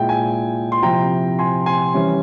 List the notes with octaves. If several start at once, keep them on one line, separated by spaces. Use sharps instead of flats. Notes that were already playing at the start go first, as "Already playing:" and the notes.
Already playing: A#2 G#3 E4 G5
G#5
C6
C3 F3 C4 E4 G5 A#5
G#5 C6
G#5 C6
E3 G3 C#4 E4